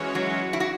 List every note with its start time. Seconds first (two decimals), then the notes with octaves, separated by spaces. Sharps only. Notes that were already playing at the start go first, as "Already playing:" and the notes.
Already playing: E3 G#3 C#4 F#4 C#5
0.15 F#3
0.53 E4
0.60 F#4